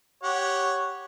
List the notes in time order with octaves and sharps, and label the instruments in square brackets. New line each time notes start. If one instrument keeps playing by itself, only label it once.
[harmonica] G4 C#5 F#5